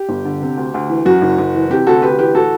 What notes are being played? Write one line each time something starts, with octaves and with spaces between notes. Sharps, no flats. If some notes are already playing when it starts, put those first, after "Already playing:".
Already playing: G4
G1
D3
C3
D2
D2
E3
F#2 F#4
F#1
F#1
E3
C3 G4
D2 F#4 A4
D2 G4 B4
E3 G4 B4
A2 F#4 A4